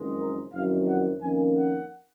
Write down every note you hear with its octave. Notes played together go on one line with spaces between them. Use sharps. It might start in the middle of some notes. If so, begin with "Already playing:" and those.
Already playing: F#1 F2 D#3 G#3
A#4
F#1 F2 D#3 F#3 F5
F#5
F2 D#3 A#3 C#4 G#5
F#5